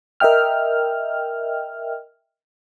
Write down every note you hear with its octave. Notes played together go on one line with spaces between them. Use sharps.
A#4 D#5 E5 G5 F6